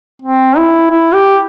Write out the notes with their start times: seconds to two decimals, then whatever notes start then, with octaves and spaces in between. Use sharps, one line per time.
0.22 C4
0.57 E4
0.91 E4
1.14 G4